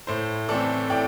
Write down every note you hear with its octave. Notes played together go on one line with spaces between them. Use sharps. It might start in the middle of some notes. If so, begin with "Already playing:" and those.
A2 C5
E3 A3 C4 A4 D5
A2 D5 G5